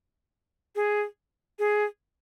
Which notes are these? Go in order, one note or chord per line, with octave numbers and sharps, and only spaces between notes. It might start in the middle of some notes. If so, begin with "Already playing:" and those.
G#4
G#4